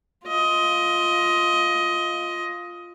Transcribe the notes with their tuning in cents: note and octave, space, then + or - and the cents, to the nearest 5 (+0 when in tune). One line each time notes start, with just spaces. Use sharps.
F4 +0 D#5 +15